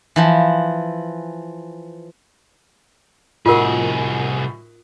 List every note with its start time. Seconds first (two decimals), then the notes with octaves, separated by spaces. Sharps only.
0.16 E3 F3
3.46 C2 A2 D#4 F4 F#4 G#4 A#4